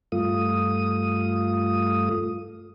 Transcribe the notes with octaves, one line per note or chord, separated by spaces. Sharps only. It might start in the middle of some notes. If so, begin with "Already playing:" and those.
G2 A3 F4 D#6